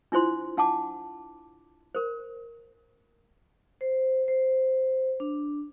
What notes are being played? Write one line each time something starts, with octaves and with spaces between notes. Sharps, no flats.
D4 E4 F4 C5 C6
D4 F#5 A5 D6
A#4 C5
C5
C5
D4